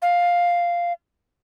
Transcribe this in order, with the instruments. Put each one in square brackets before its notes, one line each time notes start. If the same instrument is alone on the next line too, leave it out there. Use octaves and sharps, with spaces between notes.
[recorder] F5